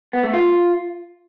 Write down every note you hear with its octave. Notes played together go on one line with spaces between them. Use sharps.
B3
A3
F4